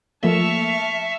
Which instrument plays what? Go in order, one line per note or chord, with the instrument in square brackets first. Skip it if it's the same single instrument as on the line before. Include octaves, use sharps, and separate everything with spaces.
[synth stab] F3 A3 A#3 [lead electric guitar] E5 [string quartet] A5 C#6 F6